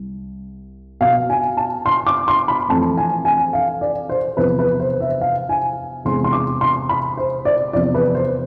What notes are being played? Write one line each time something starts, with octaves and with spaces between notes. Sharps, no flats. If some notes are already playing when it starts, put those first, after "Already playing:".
Already playing: C2
B2 B3 F5
G#5
A5
C6
D6
C6
B5
F2 E3 A3 C4 A5
G#5
G#5
F5
D5
C5
E2 C3 F3 B4
B4
C5
E5
F5
G#5
E2 C3 G#3 C4 C6
C6
D6
C6
B5
C5
D5
E2 C3 F3 D5
B4
C5